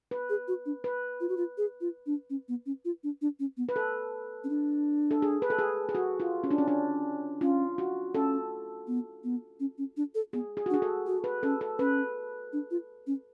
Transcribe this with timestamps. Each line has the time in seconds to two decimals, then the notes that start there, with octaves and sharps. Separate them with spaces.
0.11 B4
0.30 G#4
0.48 F#4
0.66 D4
0.84 B4
1.21 F4
1.29 F#4
1.37 F4
1.58 G#4
1.81 F4
2.06 D4
2.30 C#4
2.48 B3
2.66 C#4
2.85 F4
3.04 D4
3.22 D4
3.40 C#4
3.57 B3
3.69 B4
3.76 A4
4.44 C#4
4.49 D4
5.11 A4
5.22 G#4
5.42 B4
5.50 A4
5.59 G#4
5.89 G#4
5.95 F#4
6.20 F4
6.44 C#4
6.51 D4
6.58 C#4
6.68 D4
7.41 C#4 F4
7.78 F#4
8.14 C#4 A4
8.87 B3
9.24 B3
9.60 C#4
9.78 C#4
9.97 D4
10.15 A4
10.33 B3 G#4
10.57 G#4
10.66 F#4
10.70 D4
10.74 G#4
10.82 A4
11.06 F#4
11.24 B4
11.43 C#4 A4
11.61 A4
11.79 C#4 B4
12.53 D4
12.71 F4
13.07 C#4